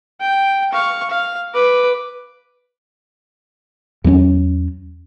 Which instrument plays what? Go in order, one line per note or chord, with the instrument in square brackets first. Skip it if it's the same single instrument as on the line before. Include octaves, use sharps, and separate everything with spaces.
[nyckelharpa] G5
F5 C#6
F5
B4 D6
[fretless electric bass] E2 F#3 A#3 C#4